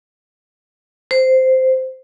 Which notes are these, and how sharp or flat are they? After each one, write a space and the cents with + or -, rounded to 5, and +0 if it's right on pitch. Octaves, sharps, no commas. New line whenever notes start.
C5 -10